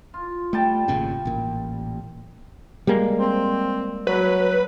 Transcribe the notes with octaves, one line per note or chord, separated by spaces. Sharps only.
F4
G3 A3 G5 A5
G#1 A#2 C#3
A1 A#2
G3 G#3 A#3
C4
F#3 B4